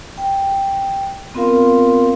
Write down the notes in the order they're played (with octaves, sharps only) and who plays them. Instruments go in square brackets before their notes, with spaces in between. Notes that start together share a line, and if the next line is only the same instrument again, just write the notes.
[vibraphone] G5
B3 C4 F4 A#4 F5 C6